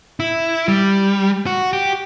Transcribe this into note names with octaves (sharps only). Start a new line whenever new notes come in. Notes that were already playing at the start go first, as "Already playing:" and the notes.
E4
G3
F#4
G4